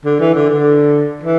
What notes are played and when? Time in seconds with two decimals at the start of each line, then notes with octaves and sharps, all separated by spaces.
0.05 D3
0.20 E3
0.35 D3
0.49 D3
1.24 E3